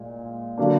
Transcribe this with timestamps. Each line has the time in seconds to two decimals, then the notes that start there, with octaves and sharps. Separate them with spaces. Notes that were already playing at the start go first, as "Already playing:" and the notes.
Already playing: A#2 G#3
0.58 D3 F#3 A#3 D4